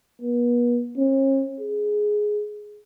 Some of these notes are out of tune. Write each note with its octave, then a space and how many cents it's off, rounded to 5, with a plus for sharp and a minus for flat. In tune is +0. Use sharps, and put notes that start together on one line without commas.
B3 -40
C#4 -45
G#4 +10